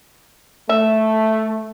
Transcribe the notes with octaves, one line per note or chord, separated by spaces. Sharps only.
A3 E5